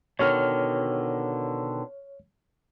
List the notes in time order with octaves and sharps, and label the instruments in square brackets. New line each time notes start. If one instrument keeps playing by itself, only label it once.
[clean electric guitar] B2 D3 D#3 [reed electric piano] C#5 F6